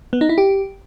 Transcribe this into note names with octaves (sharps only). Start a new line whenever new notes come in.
B3
D#4
E4
G4